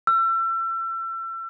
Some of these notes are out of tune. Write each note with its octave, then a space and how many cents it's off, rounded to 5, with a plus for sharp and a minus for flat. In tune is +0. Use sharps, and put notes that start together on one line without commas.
E6 +35